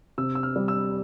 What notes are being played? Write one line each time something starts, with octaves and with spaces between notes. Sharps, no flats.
C3 E6
E6
F6
G3
E6